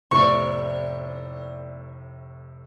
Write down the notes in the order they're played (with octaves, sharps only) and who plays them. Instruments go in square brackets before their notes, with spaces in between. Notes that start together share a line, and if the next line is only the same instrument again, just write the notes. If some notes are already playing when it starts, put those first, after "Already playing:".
[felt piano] F1 A2 C3 [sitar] B3 C5 D5 [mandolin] C#6